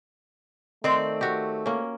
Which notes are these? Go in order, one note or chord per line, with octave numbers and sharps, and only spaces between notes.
D#3 A3 C4 D5
F#4 G4
A#3 C#4